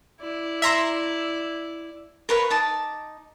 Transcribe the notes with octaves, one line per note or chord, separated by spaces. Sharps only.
E4 D5
E5 A#5 C6
A#4 B4 C#5 F5
D#4 A5 D6